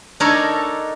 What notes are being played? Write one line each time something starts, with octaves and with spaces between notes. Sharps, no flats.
D4 D#4 A4 A#4 C#5 G#5